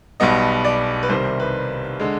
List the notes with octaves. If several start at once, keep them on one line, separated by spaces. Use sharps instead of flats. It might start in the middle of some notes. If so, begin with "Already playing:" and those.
B1 B2 G3 B3 D#5
D5
B4
C2 C3 D#3 G3 C5
B4
D3 G#3